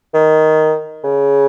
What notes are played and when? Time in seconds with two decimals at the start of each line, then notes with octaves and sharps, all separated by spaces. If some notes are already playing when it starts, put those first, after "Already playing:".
0.14 D#3
1.04 C#3